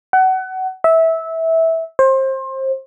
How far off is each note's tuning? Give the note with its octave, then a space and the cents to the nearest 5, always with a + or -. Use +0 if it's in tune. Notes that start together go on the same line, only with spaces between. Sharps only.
F#5 +25
E5 -20
C5 +25